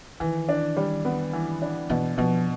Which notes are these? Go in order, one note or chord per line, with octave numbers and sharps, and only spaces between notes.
D#3 E3
D4
G3
B3
E3
D4
B2 E3
B2 F3